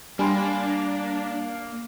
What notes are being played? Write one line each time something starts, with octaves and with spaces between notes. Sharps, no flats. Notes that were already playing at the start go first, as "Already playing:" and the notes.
G3 A#3 D4 G#5 B5 C6